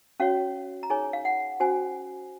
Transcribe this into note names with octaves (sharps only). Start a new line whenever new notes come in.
C#4 F#4 C#5 F5
A#5
D#4 G#4 C#5 G#5
F5
F#5
C#4 F#4 C5 G#5